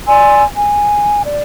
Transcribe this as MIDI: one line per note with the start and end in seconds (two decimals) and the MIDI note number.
0.08 0.43 74
0.08 0.43 80
0.08 0.43 84
0.08 0.43 88
0.57 1.24 80
1.25 1.42 74